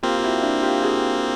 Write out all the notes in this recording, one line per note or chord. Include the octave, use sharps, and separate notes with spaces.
A#3 C4 F4 G4
F4
E4 F#4
D4 E4
F4 G4
F#4 G#4